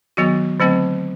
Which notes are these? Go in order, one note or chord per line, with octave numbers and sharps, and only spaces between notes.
D#3 F#3 B3 F#4
D3 F#3 A3 C4